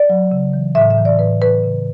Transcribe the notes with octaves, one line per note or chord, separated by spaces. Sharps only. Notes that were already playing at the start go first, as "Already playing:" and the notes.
Already playing: D5
F#3
C#3
E3
A2 E5
E5
E3
D5
A2 B4
E3 B4
C#3